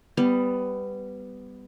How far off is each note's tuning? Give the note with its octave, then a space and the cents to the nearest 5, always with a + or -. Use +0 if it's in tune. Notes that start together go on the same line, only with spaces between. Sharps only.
G3 +5 B3 +15